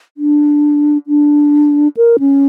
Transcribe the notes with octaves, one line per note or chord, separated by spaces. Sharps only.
D4
D4
A#4
C#4